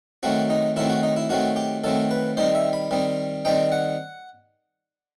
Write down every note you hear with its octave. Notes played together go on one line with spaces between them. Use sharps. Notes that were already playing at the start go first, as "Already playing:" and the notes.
D#3 F#3 A3 C4 F#4
D#4
D#3 F#3 A3 C4 E4
F#4
D#4
E4
D#3 F#3 A3 C4 F#4
G4
D#3 F#3 A3 C4 A4
B4
D#3 G3 C4 D#4 C5
E5
B5
D#3 G3 C4 D#4
D#3 G3 C4 D#4 G5
F#5